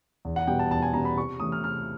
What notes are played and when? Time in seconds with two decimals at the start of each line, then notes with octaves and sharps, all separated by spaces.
0.25 E2
0.36 F#5
0.47 B2 G3 B3 G5
0.59 A5
0.71 E2 A5
0.82 G#5
0.93 B2 G3 B3 A#5
1.05 B5
1.16 C3 C#6
1.40 E3 A3 C#4 D#6
1.52 F6
1.63 C3 F6